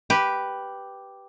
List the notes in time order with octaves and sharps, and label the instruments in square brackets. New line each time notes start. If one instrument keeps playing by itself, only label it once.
[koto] G4 B4